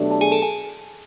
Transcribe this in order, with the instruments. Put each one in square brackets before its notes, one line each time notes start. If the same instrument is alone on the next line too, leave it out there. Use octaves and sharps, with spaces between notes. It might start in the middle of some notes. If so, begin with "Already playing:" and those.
Already playing: [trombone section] B2 F#3 A3 D4 G4
[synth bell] A5
G#4 G#5
A4 A5
G#4 G#5